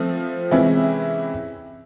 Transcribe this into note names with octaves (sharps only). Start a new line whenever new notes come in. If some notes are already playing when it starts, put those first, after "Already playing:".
Already playing: F3 A3 C4
C3 E3 G#3 C#4 E4